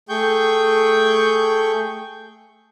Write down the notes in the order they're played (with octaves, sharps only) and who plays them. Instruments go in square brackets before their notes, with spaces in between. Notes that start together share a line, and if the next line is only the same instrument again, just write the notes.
[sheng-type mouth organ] A3 G#4 G5 C#6 G6